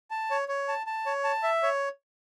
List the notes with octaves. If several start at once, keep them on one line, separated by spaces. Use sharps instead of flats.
A5
C#5
C#5
A5
A5
C#5
A5
E5
C#5